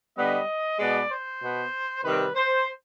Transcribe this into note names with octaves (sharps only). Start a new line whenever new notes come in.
D3 G3 B3 D#5
B2 G#3 B3 D5
C5
B2 B3
C3 D#3 G3 C4 B4
C5